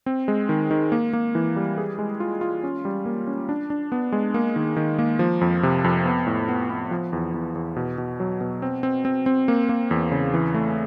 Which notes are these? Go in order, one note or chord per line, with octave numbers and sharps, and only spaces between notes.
C4
G#3
D#3
D#3
A#3
A#3
E3
G3
G#4
G#3
F4
F4
C#4
G3
A#3
C#4
D4
D4
B3
G#3
A#3
D#3
D#3
A#3
F3
F2
C3
F2
B3
A2
B3
B3
F3
E2
E2
E2
B2
B2
F#3
B2
C4
C4
C4
C4
A#3
A#3
E2
C#3
E3
A3